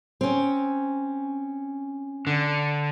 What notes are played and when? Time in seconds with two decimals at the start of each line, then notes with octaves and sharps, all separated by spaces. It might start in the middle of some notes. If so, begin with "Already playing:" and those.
0.21 C4 C#4
2.27 D3